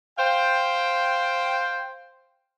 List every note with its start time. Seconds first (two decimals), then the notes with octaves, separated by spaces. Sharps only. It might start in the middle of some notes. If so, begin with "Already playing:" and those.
0.19 C5 F5 G5